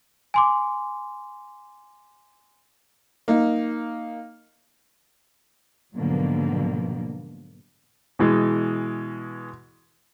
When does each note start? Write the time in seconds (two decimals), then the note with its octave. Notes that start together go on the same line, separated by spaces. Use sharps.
0.34 G#5 C6 D6
3.28 A#3 D#4
5.95 G#2 B2 D3 F3 F#3 A#3
8.19 B2 E3 G#3